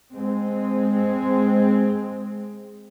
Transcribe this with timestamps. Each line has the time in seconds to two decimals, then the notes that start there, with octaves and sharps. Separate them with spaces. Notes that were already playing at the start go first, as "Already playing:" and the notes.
0.12 G#3 C4